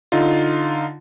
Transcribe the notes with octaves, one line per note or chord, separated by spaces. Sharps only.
D3 D#4 F4